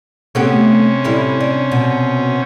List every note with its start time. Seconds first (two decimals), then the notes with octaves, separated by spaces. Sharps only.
0.35 C3 A3 B3 C#4 G4
1.04 A2 G3 E4
1.40 D4
1.72 B2